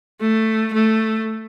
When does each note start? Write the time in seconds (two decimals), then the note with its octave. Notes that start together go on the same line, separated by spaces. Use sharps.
0.21 A3
0.73 A3